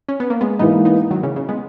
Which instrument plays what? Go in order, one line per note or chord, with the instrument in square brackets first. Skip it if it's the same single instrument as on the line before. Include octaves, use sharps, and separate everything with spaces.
[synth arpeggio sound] C#4
B3
A#3
G#3 B3
[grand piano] G#2 E3 A#3 [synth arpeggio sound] B3 D#4
[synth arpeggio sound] B3 D#4
D#3 F#3
C#3 E3
C#3
G#3 B3